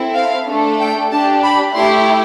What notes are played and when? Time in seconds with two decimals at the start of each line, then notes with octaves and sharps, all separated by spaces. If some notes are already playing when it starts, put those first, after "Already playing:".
Already playing: C4 E4 A4
0.14 F5
0.47 A3 D4 A4
0.80 G5
1.11 D4 G4 A5
1.43 B5
1.75 A3 E4 G4 C6